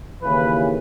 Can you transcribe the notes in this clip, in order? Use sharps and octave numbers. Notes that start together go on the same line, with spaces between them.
D#2 C#3 E3 B4